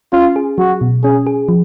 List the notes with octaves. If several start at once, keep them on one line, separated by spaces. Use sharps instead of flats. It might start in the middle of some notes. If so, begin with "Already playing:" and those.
C#4 F4
G#4
F#3 F#4
B2
C#4 G#4
G#4
F3